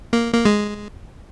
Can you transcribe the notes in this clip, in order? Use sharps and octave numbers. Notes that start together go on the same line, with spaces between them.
A#3
A#3
G#3